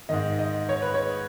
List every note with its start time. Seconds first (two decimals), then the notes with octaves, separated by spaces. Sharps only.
0.09 G#2 D#3 D#5
0.39 D#5
0.69 C#5
0.82 B4
0.94 C#5